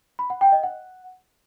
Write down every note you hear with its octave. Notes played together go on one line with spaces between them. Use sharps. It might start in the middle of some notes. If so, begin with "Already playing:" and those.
B5
F#5
G5
D#5
F#5